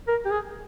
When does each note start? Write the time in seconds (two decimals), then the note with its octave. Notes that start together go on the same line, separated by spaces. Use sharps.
0.08 A#4
0.25 G4
0.31 G#4